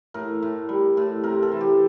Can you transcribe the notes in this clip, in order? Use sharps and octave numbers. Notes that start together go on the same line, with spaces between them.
A2 A#4
A2
G3
A2
C3 A#4
A4
E3
G4